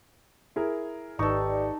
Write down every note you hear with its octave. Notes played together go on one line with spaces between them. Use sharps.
E4 G#4 A#4
G#1 D#4 G4 A4 B4 D5 C#6